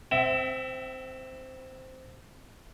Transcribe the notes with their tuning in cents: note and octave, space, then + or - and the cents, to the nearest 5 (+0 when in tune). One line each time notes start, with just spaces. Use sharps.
C4 -10 E5 +10 G5 -40